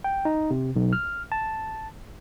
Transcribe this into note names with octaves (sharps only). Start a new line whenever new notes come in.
G5
D#4
C3
B1
F6
A5